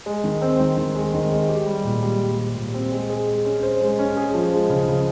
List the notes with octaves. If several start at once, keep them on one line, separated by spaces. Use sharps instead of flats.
G#3
D#3
C4
D#3
D#3
G#3
D#3
G#3
G4
G3
A#2
G3
G3
G4
A#2
C4
G#3
G#4
G#3
C#4
C5
G#3
C#4
G#4
F3
G#3
C#3
C#3